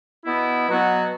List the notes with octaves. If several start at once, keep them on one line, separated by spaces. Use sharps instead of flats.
B2 B3 E4
B2 F#3 B3 F#4